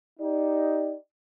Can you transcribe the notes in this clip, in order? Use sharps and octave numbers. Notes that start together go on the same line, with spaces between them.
D#4 G4 D5